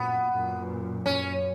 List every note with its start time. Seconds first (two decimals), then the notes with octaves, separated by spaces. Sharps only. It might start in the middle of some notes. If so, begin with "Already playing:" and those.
Already playing: F#2 A#2 B3
0.32 F#2 A#2
1.05 F#2 C#4